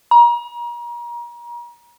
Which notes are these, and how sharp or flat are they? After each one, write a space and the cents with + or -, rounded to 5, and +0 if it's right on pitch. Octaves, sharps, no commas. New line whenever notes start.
A#5 +35